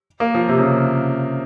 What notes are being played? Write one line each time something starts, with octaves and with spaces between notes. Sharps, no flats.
A#3
F3
C3
C#3